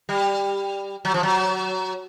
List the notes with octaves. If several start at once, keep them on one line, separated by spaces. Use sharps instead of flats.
G3
F#3
F3
F#3